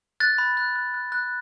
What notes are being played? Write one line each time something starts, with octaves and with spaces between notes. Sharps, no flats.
F#6 A6
B5
F#6
F#6
F#6
F#6